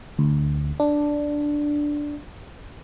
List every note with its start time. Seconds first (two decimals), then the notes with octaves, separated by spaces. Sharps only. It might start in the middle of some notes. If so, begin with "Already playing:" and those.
0.19 D2
0.80 D4